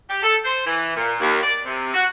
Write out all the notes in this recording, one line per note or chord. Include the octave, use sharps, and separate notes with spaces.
G4
A4
C5
E3
A#2
D#2
D5
C3
F#4